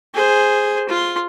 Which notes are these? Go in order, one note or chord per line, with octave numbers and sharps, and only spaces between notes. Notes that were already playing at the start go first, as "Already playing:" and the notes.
G#4 C5
F4 C6